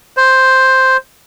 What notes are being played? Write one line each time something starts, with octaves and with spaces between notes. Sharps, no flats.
C5